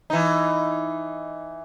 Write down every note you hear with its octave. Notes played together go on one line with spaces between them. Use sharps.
E3 D#4